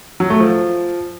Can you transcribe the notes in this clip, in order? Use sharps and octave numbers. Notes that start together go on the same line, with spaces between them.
F#3
A3
F3